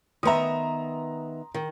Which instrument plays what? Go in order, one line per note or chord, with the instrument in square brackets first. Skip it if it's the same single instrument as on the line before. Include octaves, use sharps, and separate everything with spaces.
[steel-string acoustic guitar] D#3 B3 E5 [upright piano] A#5 C6 D#6
[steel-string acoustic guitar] D#3